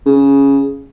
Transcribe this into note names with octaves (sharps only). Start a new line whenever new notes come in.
C#3